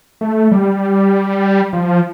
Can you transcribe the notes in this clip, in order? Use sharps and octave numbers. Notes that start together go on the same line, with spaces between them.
A3
G3
F3